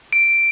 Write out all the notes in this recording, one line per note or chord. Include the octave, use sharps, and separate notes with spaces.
D7